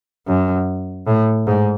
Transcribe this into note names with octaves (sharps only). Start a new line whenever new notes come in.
F#2
A2
G#2